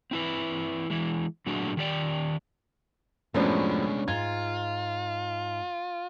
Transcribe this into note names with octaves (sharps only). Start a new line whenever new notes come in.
C4 E4 B4
E3 G#3
A#2 F#3 A3 D4 F#4 G#4
D#3 G4 D5 G5
C2 F#2 A2 F3 G#3 B3 C#4 D4
G#2 F4 G#6